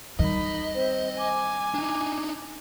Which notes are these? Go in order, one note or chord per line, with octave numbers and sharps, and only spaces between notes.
D#3 G3 D#4 D#5 B5
C4 C5
G#5 D6
D4 D#4